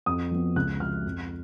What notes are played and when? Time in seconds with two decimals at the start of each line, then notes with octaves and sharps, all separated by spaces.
0.06 F2 D#6
0.31 F3 B3
0.56 C#2 F#6
0.80 C#3 F3 F6
1.05 F2